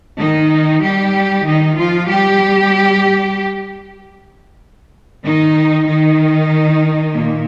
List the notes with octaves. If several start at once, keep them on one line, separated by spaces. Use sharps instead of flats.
D#3 D#4
G3 G4
D#3 D#4
F3 F4
G3 G4
D#3 D#4
D#3 D#4
A#2 A#3